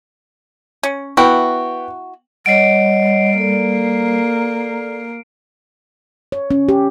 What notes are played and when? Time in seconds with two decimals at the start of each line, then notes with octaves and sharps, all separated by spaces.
0.83 C#4
1.17 B3 E4 F#4 G5 F#6
2.46 G3 C#5 D#5 F#5 C7 D7
3.38 A#3 A4 D5
6.32 C#5
6.51 C#4
6.69 G4